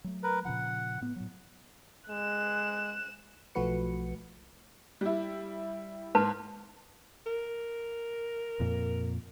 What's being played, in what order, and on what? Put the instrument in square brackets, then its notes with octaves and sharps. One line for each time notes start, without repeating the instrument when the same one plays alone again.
[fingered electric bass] F#3 A3
[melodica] A#4 B4
[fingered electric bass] A#2 C#3 F3 [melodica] F#5
[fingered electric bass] A2 B3
A2 F#3
[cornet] G#3 [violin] F#6 E7
[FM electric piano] B1 F3 A3 F#4 B4 C#7
[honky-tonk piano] G3 E4
[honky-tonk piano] G#2 [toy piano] B4 A5
[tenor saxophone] A#4
[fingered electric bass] F2 A#2